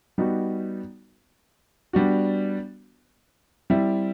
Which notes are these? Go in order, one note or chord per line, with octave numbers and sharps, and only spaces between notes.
G3 B3 D#4 F#4
G3 B3 D4 F#4
G3 C4 E4